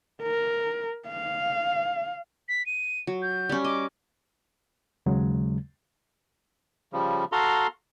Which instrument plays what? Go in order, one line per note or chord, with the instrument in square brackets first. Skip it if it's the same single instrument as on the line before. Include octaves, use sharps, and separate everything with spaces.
[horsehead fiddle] A#4
F5
[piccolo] B6
D#7
[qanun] F#3
[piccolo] G6
[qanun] G3 C#4
[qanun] D#5 [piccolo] D6
[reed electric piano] D#2 C#3 F#3 G#3
[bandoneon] C#3 F3 G3
F#4 A4 F5 A#5 C6